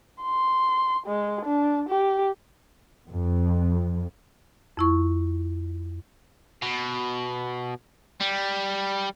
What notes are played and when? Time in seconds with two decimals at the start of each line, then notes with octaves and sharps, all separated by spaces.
0.22 C6
1.06 G#3
1.45 D4
1.89 G4
3.09 F2
4.77 F2 E4 C#6
6.62 B2
8.20 G3